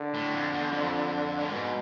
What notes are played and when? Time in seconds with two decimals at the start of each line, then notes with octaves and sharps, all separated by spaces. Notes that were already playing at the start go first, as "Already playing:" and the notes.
Already playing: D3
0.14 A2
0.33 F2
0.52 E2
0.72 F2
1.40 A2
1.51 G#2 B2